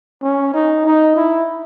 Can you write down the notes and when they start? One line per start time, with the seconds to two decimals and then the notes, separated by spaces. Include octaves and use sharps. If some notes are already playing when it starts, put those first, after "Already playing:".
0.22 C#4
0.54 D#4
0.86 D#4
1.16 E4